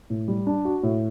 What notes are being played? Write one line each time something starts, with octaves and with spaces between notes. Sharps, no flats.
A2
G3
D4
F#4
A2